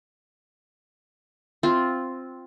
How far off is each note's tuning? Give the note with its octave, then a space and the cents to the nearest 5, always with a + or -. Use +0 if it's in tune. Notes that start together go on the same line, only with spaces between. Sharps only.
C4 +0 F4 +0